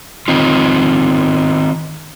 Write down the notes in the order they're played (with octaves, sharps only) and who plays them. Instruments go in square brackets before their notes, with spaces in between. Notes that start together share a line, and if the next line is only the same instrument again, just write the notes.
[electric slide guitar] D#3 C4 D#4 F4